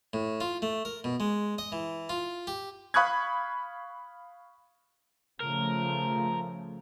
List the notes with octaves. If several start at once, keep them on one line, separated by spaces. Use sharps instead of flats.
A2
F4
A3
A#4
B2
G#3
D#5
E3
F4
G4
F5 B5 C#6 D#6 F#6 G#6
C#3 F3 A3 A#4